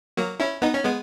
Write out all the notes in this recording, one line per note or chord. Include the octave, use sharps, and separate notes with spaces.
F#3 A#3
C#4 E4
B3 D#4
C#4
G#3 B3